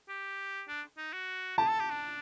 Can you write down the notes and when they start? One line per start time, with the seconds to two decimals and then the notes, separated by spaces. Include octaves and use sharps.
0.09 G4
0.68 D4
0.98 D#4
1.13 F#4
1.58 G4 A5
1.69 A4
1.80 G4
1.91 D4